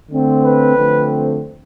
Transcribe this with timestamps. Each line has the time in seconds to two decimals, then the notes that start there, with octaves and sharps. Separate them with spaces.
0.11 D3 A3 C4
0.43 B4
0.76 D3 F3 A3 C4